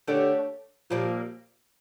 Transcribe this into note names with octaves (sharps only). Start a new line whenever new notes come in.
D3 A3 D4 G4 C#5
A#2 F3 G3 A#3